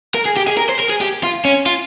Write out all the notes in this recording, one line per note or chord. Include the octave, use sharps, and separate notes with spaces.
A#4
G#4
G4
G#4
A#4
C5
A#4
G#4
G4
F4
C#4
F4